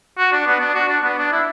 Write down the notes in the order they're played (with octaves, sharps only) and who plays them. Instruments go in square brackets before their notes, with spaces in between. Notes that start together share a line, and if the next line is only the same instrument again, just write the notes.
[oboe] F#4
D4
B3
D4
F#4
D4
B3
D4
E4